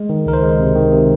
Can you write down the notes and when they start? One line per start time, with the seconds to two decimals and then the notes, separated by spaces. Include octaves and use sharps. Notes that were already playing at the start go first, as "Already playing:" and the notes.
Already playing: G#3
0.09 D#3
0.26 C#2 A#4
0.33 C5
0.43 G#3
0.60 C3
0.76 D#3
0.92 C3